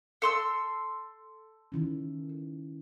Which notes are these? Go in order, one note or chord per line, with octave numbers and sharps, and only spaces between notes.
A4 C6 E6
D#3 E3 C#4